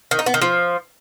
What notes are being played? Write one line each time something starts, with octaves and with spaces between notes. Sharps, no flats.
D#3
D#4
B3
D#3
F3